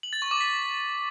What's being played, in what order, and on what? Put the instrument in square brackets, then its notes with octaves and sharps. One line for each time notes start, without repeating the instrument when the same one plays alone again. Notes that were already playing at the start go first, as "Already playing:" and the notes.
[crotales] F#7
A6
C#6
D6
B6